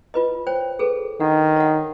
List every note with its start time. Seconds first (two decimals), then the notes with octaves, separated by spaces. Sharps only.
0.14 F4 B4 D#5
0.47 C5 C#5 G5
0.79 G#4 A4 B4
1.20 D#3 D4 F#5
1.56 C#5 F#5